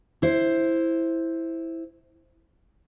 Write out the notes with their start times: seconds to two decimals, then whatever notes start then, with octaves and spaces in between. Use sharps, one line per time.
0.22 E4 C5